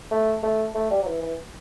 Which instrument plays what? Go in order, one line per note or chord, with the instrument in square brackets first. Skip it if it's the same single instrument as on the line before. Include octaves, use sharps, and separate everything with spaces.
[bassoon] A3
A3
A3
G3
F#3
E3
E3